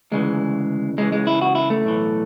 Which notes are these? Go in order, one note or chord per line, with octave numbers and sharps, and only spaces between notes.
D2 C#3 E3 G#3
C#2 C#3 E3 G#3
G#3
E4
F#4
E4
A3
B1 A2 E3